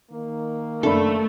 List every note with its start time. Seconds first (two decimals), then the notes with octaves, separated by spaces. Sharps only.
0.12 D#3 A#3
0.83 F#1 A3 D4 A4 B5